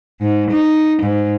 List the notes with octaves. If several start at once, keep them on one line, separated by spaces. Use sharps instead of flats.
G#2
D#4
G#2